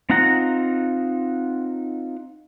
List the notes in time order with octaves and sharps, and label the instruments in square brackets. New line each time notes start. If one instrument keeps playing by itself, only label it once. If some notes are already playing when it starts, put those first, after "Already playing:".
[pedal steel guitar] C4 D#4 F4 F#5 A#5